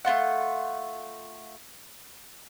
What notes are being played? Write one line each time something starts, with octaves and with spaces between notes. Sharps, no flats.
A3 B3 F4 F#5